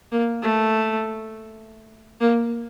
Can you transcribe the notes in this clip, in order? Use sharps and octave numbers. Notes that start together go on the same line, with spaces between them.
A#3
A3
A#3